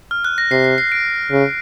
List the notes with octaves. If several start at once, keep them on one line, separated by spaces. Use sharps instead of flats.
F6
F#6
A#6
C3 C7
C7
C7
D7
C#3